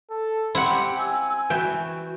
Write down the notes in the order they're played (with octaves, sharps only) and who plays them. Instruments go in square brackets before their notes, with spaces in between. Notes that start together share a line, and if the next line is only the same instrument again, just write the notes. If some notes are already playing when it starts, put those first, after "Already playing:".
[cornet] A4
[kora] C4 [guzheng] E4 F#5 [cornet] G4
[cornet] G#5 [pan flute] E6
[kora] E3 [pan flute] F#4 [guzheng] G5